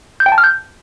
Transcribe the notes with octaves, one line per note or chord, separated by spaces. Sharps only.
G6
G5
A5
F6
G6